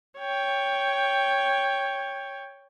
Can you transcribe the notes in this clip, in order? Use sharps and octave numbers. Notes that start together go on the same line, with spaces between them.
C#5 G5